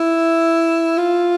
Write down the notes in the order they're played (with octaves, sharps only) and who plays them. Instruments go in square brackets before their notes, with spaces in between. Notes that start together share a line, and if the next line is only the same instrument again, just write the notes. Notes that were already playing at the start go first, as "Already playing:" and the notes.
Already playing: [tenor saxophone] E4
F4